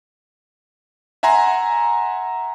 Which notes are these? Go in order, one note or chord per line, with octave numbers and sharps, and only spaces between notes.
E5 F#5 G#5 A#5 C6